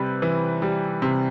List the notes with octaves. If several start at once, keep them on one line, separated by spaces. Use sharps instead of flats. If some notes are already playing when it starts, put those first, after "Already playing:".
Already playing: C3 G3 B4
E3
G3
C3